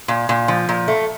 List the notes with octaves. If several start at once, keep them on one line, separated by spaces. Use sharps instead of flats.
A#2
A#2
F3
A#2
A3